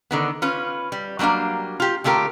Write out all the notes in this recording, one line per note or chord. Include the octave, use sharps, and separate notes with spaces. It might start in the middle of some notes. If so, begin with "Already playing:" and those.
D3 D#3 B3
C#4 F4 B4
G3
F#3 G3 A#3 D4 F5
F4 G4
D3 A3 F4 G4 A#4